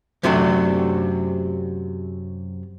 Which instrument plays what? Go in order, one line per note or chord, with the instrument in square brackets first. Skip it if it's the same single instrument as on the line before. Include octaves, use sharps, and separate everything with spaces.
[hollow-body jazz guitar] F#2 C3 F#3 A3 D4